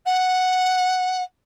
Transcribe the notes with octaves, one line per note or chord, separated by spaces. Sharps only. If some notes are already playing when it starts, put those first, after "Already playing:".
F#5